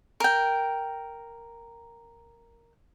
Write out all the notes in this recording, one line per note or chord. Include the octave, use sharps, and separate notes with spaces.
A#4 G5